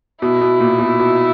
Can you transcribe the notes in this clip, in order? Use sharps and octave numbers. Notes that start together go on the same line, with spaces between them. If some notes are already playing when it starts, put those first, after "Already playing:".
B2 E4
B2
A#2
B2
B2